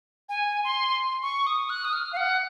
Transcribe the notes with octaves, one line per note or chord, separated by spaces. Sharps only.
G#5
C6
C#6
D#6
F#6
D#6
F6
F5
F#5